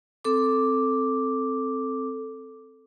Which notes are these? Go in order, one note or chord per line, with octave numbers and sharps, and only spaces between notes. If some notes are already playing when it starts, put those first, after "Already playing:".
C4 A4 D6